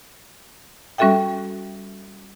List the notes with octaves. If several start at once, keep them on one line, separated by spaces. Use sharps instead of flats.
G3 C#4 F#4 A4 E5 G5